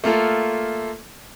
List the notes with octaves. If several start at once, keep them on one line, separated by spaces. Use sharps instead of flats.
A3 A#3 F4 A4